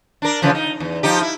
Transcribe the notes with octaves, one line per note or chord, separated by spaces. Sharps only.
D4 A#4
C#3 E3 F3
D#4
E2
F3 D#4 G4
E4